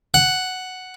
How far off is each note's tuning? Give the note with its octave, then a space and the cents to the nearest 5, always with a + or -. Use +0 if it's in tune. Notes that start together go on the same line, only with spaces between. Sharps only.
F#5 +5